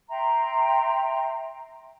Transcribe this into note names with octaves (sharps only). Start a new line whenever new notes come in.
E5 G5 A#5 C6